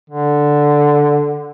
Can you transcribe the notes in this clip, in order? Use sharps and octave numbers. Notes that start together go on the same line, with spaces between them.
D3